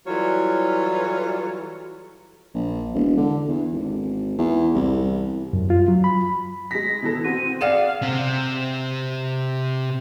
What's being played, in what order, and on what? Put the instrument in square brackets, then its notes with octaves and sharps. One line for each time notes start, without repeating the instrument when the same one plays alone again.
[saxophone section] E3 F#3 G3 F4 A4 C#5
[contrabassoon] A#1
E1
D3
E2
G#1
E2
C2
[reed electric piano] F#2
F4
F#3
B5
[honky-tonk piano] G#3 B6 [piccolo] A#6
[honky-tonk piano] B2 E3 A4
[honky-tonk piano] C4 F#4 [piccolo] D#7
[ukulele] G#4 D5 F#5 [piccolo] F5 [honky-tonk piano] E7
[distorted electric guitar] C3 C4